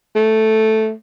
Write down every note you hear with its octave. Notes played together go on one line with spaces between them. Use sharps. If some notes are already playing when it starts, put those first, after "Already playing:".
A3